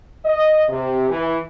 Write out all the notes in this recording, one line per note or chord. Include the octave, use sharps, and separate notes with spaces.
D#5
C3
E3